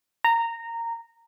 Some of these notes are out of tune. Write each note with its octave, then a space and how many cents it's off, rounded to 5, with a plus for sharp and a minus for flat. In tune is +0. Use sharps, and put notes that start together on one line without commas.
A#5 -15